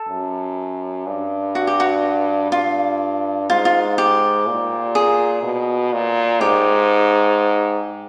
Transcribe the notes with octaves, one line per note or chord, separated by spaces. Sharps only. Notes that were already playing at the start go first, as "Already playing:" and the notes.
Already playing: A4
F#2
G2
F#4
G4
F#4
G2 F4
G#2 F4
F4
G4
A#2
G#4
B2
A#2
G#2 G4